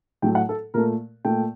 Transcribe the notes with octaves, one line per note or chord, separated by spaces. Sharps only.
A2 F#3 A3 G5
F#5
A4
A#2 A3 A#4
A#2 A3 G5